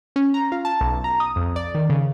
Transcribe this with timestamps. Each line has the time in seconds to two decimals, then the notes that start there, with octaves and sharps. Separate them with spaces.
0.16 C#4
0.34 A#5
0.52 F4
0.65 A5
0.81 B1
1.04 A#5
1.20 D#6
1.36 F2
1.56 D5
1.75 D#3
1.90 C#3